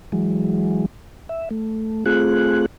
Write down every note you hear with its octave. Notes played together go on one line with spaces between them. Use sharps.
E3 F#3 G#3
E5
A3
A3 C4 F4 G#4 F#6